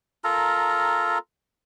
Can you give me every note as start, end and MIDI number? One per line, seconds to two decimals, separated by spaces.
0.24 1.18 65
0.24 1.18 69
0.24 1.18 70
0.24 1.18 82